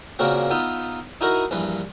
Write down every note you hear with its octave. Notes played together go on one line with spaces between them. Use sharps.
A#2 C#3 A#3 C4 F#4
B3 D#4 F4 E5
D#4 E4 F#4 A#4 D#5
A#1 G2 E3 B4